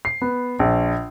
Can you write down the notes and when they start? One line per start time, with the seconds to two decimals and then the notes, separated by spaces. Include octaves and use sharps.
0.05 C7
0.22 B3
0.59 A#1